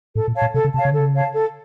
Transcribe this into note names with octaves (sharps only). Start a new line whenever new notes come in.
A2 A4
A#2
C#5 F5 A5
A#2
C3 A4
C#3
C3 C#5 F5 A5
C#3
D3 A4
C#3
C#5 F5 A5
A4